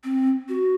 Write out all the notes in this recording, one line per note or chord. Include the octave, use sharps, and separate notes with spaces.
C4
F#4